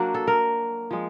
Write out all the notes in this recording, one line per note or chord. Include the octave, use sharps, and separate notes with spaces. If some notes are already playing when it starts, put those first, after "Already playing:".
Already playing: F#3 A#3 D4 F#4
A4
A#4
F3 G#3